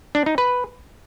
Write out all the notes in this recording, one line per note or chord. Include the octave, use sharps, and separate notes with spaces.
D4
D#4
B4